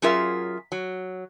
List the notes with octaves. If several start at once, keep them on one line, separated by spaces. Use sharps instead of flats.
F#3 C#4 F4 G#4 A#4 E5
F#3